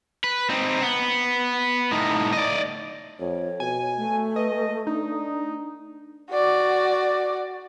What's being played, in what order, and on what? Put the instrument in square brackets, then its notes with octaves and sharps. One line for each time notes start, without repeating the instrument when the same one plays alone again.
[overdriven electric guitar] B4
C4 D#4
B3
A2 D#4
D5 D#5
[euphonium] F2 [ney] C#5
[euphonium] B2 [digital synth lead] G#5
[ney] A3
[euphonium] B4 [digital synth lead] D#5
[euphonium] D4 [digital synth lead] D#4
[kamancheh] F#4 D5